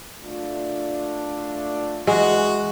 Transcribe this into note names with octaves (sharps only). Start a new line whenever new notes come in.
A3 D4 F4
E3 G#3 F#4